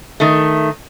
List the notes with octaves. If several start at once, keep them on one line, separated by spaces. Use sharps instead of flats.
D#3 A3